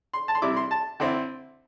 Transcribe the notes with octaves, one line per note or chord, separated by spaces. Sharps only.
C6
A5
C6
C3 G3 E4 D6
C6
A5
D3 C4 E4